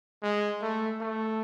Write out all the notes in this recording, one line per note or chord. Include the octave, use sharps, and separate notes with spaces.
G#3
A3
A3